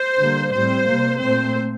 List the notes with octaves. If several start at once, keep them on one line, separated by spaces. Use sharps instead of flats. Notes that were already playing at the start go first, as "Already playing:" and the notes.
Already playing: C5
D3 G3 A#3
A2 G3 C4 C5
C3 G3 A#3
A#2 A3 C4 C5